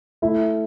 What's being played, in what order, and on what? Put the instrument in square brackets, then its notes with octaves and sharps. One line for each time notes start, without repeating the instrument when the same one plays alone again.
[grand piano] A3 [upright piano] E4